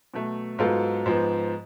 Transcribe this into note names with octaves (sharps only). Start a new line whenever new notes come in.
B2 F#3 A3
G#2 F#3 B3 F4 A4
G#2 F3 B3